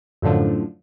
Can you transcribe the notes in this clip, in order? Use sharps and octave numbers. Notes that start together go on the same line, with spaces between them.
F#2 A2 D3 F3